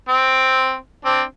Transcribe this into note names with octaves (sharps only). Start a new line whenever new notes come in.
C4
C4 D4